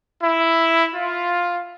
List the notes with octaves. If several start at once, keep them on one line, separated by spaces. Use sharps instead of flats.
E4
F4